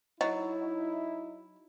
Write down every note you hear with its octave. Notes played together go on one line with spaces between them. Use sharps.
F#3 D#4 E4 D#5